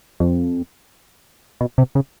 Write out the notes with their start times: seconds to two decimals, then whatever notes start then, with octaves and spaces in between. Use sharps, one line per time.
0.20 F2
1.61 B2
1.78 C3
1.95 C#3